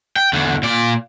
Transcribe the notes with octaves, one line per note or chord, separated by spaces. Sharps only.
G5
E2 D3
A#2 D5